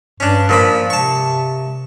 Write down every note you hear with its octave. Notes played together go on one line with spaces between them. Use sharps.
G2 C#4 D4
A#2 F3 B5
C3 A5 C#6